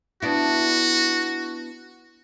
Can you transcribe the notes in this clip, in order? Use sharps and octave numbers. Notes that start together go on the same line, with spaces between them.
B3 D4 E4 F#4